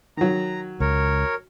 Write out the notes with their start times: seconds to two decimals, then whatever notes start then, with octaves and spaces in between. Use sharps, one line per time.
0.17 D#3 F#3 A#5
0.80 C#2 A#4 C#5